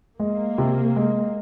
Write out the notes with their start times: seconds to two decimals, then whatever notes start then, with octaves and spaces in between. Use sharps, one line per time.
0.20 G#3 A#3
0.58 C3
0.96 G#3